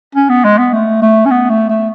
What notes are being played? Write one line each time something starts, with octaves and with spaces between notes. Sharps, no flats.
C#4
B3
G#3
B3
A3
A3
C#4
B3
A3
A3